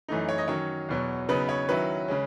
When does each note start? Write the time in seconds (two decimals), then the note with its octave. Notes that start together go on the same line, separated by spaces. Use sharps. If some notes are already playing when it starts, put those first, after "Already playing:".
0.08 F#2 E3 A3 D#4
0.29 C#5
0.38 D#5
0.48 D#3 F#3 C#4 C#5
0.89 E2 B2 F#3
1.29 C#3 F#3 B3 D#4 B4
1.49 C#5
1.68 D#3 F#3 C#4 E4 B4
2.08 C#3 G#3 C#4